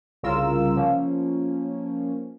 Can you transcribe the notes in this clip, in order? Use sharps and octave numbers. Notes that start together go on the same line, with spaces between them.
C2 C#3 F4 A#4 E6
F3 A#3 C#4